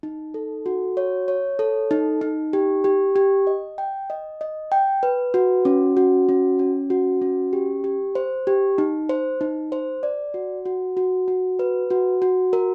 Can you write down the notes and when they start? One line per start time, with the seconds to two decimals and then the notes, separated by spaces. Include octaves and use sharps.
0.03 D#4
0.34 A4
0.66 F#4
0.97 C#5
1.28 C#5
1.59 A4
1.91 D#4
2.21 D#4
2.53 G4
2.84 G4
3.16 G4
3.47 D#5
3.78 G5
4.10 D#5
4.41 D#5
4.72 G5
5.03 B4
5.34 F#4
5.65 C#4
5.97 F#4
6.29 C#4
6.59 C#4
6.90 F#4
7.22 C#4
7.53 G4
7.84 G4
8.15 C5
8.47 G4
8.78 D#4
9.09 C5
9.41 D#4
9.72 C5
10.03 D5
10.34 F#4
10.66 F#4
10.97 F#4
11.28 F#4
11.59 B4
11.90 F#4
12.22 F#4
12.53 A#4